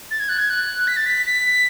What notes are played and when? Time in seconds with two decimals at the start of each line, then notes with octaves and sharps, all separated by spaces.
0.11 A6
0.20 G#6
0.29 F#6
0.38 G#6
0.50 F#6
0.87 B6
0.97 A6
1.06 B6
1.26 B6